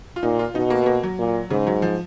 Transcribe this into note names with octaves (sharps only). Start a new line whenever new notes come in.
F4
A#2 D#4
F4
B2 D#4
A#3
B3
A#3
F#3
A#2
G#2 C#3
F#3
F3